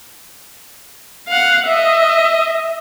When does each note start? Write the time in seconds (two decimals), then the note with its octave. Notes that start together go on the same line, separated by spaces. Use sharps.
1.28 F5 F#5
1.66 D#5 E5